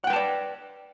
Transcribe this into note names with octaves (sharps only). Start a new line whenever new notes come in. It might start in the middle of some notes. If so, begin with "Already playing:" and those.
B4 D5 F#5 G5 A5